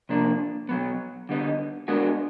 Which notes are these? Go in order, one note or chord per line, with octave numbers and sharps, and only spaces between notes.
C3 F3 A#3 D4
B2 F#3 B3
D3 G3 B3 D#4
G#3 B3 D4 F#4 A#4